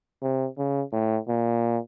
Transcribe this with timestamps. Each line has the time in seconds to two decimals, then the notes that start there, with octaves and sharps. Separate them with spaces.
0.22 C3
0.58 C#3
0.93 A2
1.28 A#2